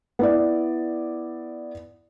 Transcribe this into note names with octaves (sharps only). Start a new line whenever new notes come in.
B3 E4 D5